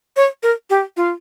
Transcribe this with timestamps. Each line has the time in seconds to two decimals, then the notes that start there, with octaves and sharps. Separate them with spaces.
0.17 C#5
0.43 A#4
0.70 G4
0.97 F4